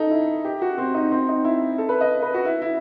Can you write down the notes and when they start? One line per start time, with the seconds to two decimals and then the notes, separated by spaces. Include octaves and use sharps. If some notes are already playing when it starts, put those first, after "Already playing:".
Already playing: D#4 A4
0.11 E4
0.45 G4
0.62 F#4
0.78 C4
0.94 D#4
1.11 C4
1.29 D#4
1.45 E4
1.78 A4
1.89 B4
2.01 D#5
2.22 B4
2.34 F#4
2.45 E4
2.62 E4